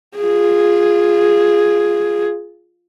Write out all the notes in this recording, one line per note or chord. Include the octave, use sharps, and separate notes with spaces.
F4 G#4